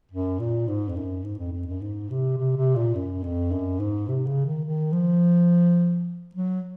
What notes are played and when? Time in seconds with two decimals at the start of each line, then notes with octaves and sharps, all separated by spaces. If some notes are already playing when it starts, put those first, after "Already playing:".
0.12 F#2
0.40 A#2
0.68 G#2
0.89 F2
0.97 F#2
1.24 G#2
1.38 F2
1.53 F2
1.67 F#2
1.81 G#2
2.10 C3
2.38 C3
2.57 C3
2.76 A#2
2.95 F#2
3.23 F2
3.52 F#2
3.80 G#2
4.08 C3
4.27 C#3
4.46 D#3
4.65 D#3
4.93 F3
6.35 F#3